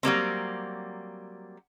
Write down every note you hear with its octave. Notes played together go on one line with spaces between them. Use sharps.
F#3 G3 A#3 C4